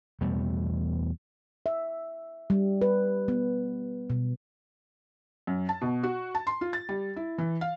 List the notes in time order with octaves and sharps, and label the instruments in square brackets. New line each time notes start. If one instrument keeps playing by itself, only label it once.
[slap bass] E2 B2 G3 A3
[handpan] E5
G3
B4
B3
B2
[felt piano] F#2
A5
B2
F#4
A5
C6
F4
A6
G3
E4
E3
F5